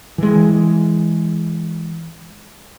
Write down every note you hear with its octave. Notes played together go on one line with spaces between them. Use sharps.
E3 G#3